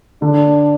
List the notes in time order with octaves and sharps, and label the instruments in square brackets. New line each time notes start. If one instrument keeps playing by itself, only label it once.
[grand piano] D3 [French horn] D4